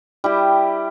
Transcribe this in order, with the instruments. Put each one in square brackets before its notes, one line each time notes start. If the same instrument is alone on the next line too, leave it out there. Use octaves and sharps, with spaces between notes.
[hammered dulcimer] G3 E4 G4